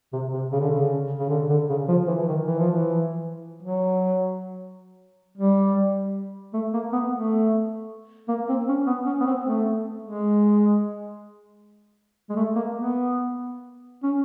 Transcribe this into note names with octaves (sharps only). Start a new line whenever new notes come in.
C3
C3
C#3
D3
C#3
C#3
D3
D3
C#3
F3
E3
E3
D#3
E3
F3
E3
F#3
G3
A3
A#3
B3
A3
A#3
C4
C#4
B3
C#4
B3
C4
A3
G#3
G#3
A3
A#3
B3
C#4